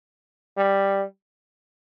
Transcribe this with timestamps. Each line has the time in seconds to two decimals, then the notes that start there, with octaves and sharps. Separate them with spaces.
0.57 G3